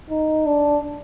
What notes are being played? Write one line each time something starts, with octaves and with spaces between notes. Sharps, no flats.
D#4
D4